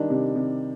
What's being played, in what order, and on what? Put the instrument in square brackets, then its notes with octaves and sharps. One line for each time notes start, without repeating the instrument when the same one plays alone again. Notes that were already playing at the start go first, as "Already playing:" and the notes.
Already playing: [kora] D#3 [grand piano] G3 D4
[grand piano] C3
C3